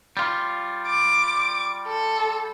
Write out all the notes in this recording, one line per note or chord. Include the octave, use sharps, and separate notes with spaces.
G3 F4
D6
A4